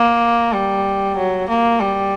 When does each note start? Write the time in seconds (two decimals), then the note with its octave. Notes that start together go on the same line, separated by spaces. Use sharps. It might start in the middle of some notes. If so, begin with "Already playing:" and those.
Already playing: A#3
0.53 G3
1.17 F#3
1.49 A#3
1.80 G3